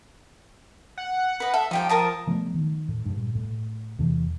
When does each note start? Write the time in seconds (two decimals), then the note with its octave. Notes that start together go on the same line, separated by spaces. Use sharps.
0.98 F#5
1.40 B4 D#5
1.54 A4 E5
1.71 F3 D#4 G4 G5
1.89 A#4 A5 D#6
2.27 F3 A3 B3
2.54 D#3
2.89 A2
3.06 G2 A#2
3.35 A2
3.99 E2 C3 E3